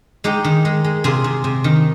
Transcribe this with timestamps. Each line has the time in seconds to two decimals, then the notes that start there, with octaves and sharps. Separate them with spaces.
0.24 G#3 D#4 G4
0.44 D#3
0.65 G#3
0.84 G#3
1.04 C3 F4 G#4
1.24 C3
1.44 C3
1.64 D#3